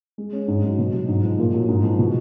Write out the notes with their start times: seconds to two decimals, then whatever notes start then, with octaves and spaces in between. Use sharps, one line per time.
0.18 G#3
0.33 C#4
0.48 G#2
0.63 F#3
0.78 B2
0.93 F#3
1.08 G#2
1.23 F3
1.38 A#2
1.53 F#3
1.68 G#2
1.84 F3
1.99 B2